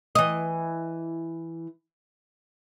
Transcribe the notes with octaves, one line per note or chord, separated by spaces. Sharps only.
E3 D#5